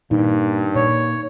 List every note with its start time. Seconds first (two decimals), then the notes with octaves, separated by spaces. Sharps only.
0.11 G2 A#2 D#3
0.75 A#2 C#5